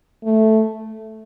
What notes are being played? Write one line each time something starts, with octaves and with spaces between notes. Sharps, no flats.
A3